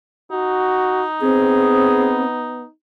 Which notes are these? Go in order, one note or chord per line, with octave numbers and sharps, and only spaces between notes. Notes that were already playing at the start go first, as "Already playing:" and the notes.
D#4 F#4
B3 C4 G#4